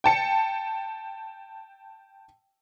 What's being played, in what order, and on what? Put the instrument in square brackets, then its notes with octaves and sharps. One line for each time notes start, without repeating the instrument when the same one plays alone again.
[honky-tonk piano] G5 A5 C#7